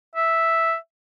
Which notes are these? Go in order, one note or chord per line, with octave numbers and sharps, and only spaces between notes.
E5